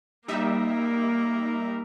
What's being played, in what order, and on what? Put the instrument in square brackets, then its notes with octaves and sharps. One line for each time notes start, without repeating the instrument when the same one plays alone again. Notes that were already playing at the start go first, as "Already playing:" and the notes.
[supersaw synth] G3 D#4 E5 [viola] A#3 A#4